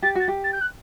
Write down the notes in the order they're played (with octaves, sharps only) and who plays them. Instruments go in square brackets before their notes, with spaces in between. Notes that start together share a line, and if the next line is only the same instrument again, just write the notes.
[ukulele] G4 [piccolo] A6
[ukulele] F#4 [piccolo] A6
[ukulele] G4
[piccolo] A6
G6
F#6